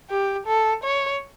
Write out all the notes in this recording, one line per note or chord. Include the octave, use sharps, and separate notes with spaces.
G4
A4
C#5